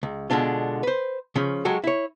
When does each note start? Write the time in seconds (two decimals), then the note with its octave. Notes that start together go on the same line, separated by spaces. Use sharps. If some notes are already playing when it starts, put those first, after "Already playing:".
0.03 C#2
0.30 B2 D3 G#3 D4 F4
0.83 B4 C5
1.35 C#3 F3 C#4
1.65 F#3 G#3 F#4 G4 A4
1.84 E4 C#5